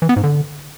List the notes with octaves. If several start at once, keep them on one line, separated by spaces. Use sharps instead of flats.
E3
B3
G#2
D3